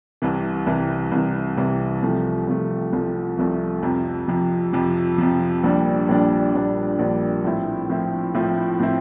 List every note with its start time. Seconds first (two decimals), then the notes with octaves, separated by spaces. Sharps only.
0.22 C2 C3 E3
0.67 C2 C3 E3
1.12 C2 C3 E3
1.57 C2 C3 E3
2.02 C2 C3 F3 A3
2.47 C2 C3 F3 A3
2.93 C2 C3 F3 A3
3.38 C2 C3 F3 A3
3.83 F2 C3 F3
4.28 F2 C3 F3
4.73 F2 C3 F3
5.18 F2 C3 F3
5.63 A#1 A#2 G3 D4
6.09 A#1 A#2 G3 D4
6.54 A#1 A#2 G3 D4
6.99 A#1 A#2 G3 D4
7.44 A2 F3 C4 E4
7.89 A2 F3 C4 E4
8.34 A2 F3 C4 E4
8.79 A2 F3 C4 E4